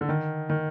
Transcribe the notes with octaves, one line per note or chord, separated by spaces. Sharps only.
D3
D#3
D#3